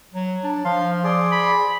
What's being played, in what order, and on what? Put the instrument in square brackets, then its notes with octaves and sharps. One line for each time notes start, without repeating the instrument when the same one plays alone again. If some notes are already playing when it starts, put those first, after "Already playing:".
[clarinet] F#3
D4
[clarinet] F3 [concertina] F5 C6
[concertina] G#4 D5 C6
[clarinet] B5